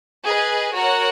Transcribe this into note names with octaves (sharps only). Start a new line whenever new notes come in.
G#4 B4 D#5 G#5
F#4 A#4 C#5 F#5